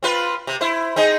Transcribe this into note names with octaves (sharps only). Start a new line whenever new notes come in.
C4 F4 B4
C3
E4 C5
C4 D#4 G#4